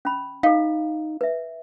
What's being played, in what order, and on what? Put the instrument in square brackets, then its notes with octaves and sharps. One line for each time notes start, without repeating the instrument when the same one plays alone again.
[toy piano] C#4 B5
[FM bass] D#4 [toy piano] A4 F5
[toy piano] B4 E5